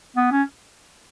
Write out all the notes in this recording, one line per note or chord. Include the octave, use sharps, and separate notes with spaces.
B3
C#4